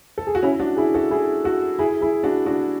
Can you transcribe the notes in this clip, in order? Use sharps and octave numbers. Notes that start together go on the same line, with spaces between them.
A4
G#4
F#4
C#4 E4
D4 F#4
E4 G#4
F#4 A4
E4 G#4
F#4 A4
E4 G#4
E4 G#4
D4 F#4
D4 F#4